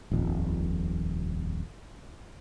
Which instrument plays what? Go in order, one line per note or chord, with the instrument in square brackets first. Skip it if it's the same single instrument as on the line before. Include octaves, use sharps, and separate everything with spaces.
[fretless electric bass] D#1 A#1 F2